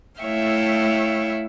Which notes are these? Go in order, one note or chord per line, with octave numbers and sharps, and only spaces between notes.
A3 E4 C#5 E5 F5 G5